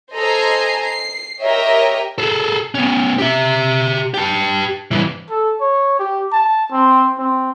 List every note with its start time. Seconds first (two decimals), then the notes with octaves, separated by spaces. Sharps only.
0.14 A4 C5 D#5 G#5 A#5 C7
0.83 C7
1.41 G4 A#4 C#5 D#5 E5 G5
2.18 G#4 A4
2.75 B3 C#4
3.19 G4 E5
4.14 G4 A5
4.91 G2 E3
5.30 A4
5.61 C#5
5.99 G4
6.33 A5
6.72 C4
7.19 C4